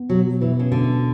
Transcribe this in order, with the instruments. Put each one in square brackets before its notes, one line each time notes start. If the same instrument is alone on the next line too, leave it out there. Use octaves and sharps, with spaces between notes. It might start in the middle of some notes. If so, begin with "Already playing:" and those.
Already playing: [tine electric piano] B3
[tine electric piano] B2 [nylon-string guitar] F#3
[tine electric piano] B2 [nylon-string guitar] E3
[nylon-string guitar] C#3
[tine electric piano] B2 [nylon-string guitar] D3